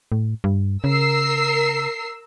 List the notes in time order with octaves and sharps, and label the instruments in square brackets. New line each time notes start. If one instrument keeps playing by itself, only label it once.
[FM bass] A2
G2
[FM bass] C#3 [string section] A#4 E6 C7